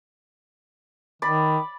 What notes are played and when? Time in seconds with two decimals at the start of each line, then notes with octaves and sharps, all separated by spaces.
1.22 D#3 D5 B5